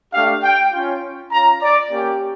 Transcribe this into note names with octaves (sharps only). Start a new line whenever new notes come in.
A3 D4 G4 F5
G5
C#4 F4
C#4 F4 A#5
D5
A#3 C#4 G4